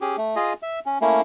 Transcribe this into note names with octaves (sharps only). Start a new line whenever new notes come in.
C#4 G4 G#4
A3
F4 G#4 D#5
E5
C#4
A3 A#3 C#4 E4